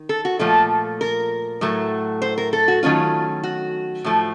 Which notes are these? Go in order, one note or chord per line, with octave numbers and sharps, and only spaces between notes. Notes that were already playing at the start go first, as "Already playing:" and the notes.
Already playing: D#3
A4
F#4
A#2 F3 A3 A4
A#4
A2 F#3 A3
C5
A#4
A4
F#4
D#3 F#3 A3 C#4 F4
F#4
A2 F3 A3